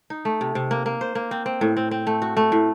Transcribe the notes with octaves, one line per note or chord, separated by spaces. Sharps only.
D#4
A3
C3
C3
A#3
A#3
C5
A#3
C4
C4
A2
C4
C4
A3
F#4
A3
A2